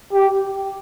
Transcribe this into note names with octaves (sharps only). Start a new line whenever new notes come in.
G4